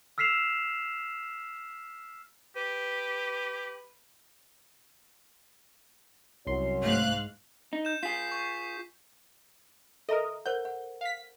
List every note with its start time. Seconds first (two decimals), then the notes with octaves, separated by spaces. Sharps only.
0.18 E6 F6 B6 C7 E7 F7
2.56 G4 B4
6.47 C2 F#2 F#3 C#5 C6
6.83 G#2 A3 F5 F#6
7.73 D#4
7.85 G6 E7
8.03 F4 G#4 B6 C7
8.32 C#6
10.09 A4 A#4 D#5 E5 A#5
10.46 A#4 C5 F#5 G6
10.65 F#5
11.01 F5 B6